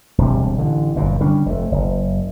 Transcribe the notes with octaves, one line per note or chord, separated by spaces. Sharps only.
E1 D2 C3 G3
A1 D3
G1 F#2 A#2
D3 G3 C#4 D4
F1 F2 A3
F#1